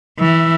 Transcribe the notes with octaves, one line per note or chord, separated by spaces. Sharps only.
E3 E5